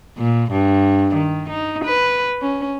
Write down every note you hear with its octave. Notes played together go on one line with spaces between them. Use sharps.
A#2
G2
D#3
D#4
B4
C#4